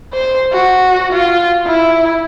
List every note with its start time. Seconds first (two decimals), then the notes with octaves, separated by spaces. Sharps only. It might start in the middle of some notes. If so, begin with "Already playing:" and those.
0.13 C5
0.53 F#4
1.13 F4
1.67 E4